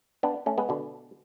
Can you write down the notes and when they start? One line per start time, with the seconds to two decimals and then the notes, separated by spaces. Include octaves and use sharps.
0.23 B3 D4
0.46 A3 C#4
0.58 G#3 B3
0.69 B2 D3